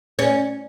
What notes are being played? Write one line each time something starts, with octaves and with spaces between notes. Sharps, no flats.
C#4